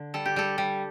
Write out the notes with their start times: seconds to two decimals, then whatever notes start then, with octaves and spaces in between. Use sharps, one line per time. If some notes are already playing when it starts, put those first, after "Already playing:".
Already playing: D3
0.14 G3 A4
0.26 G4
0.36 G3 A4
0.58 G3